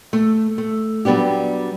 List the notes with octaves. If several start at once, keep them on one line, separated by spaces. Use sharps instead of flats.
A3
A3
F#3 G3 B3 D4 G4